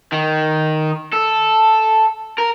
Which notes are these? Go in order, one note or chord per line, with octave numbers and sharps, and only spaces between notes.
D#3
A4
A#4